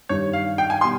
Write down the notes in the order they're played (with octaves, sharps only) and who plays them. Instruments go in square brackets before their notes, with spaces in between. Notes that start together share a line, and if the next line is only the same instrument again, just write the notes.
[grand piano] G2 D#3 G3 [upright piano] C#5
[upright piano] F5
G5
G#5
[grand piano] B2 G3 [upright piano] C6